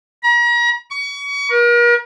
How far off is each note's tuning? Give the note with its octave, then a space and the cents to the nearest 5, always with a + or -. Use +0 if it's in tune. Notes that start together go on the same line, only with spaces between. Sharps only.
A#5 +40
C#6 +35
A#4 +40